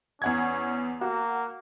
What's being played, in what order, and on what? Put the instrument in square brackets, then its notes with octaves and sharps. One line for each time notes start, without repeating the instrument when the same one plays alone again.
[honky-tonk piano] E2 F#5 G#6 [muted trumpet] C#4
[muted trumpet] A#3 [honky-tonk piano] F#4